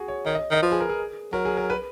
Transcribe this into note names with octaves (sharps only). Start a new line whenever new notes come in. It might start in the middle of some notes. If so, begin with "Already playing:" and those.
Already playing: F#4 G#4
C#5
D#3 C#5
D#5
D#3 D#5
F3 B4
G#4
A#4
G#4
F#3 A#4
G#4
A#4
B4